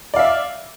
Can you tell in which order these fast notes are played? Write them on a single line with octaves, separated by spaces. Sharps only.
D5 F5 E5